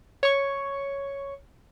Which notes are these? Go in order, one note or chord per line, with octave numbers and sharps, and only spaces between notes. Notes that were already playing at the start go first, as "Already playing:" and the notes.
C#5 C#6